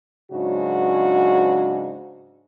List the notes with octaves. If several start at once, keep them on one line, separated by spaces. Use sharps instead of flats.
G#2 C#3 F#3 D4 F#4